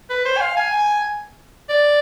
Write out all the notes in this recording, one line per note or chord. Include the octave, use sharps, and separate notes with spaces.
B4
C5
G#5
F5
G#5
D5